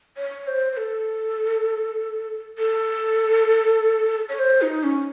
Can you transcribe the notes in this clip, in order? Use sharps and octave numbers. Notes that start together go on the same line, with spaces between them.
C#5
C5
C5
A4
A4
C#5
C5
D#4
C#4